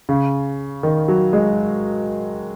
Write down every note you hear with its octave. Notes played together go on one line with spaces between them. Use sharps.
C#3
D#3
F#3
G#3